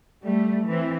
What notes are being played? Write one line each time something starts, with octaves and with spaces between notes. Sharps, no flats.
G3 A3
E3 C4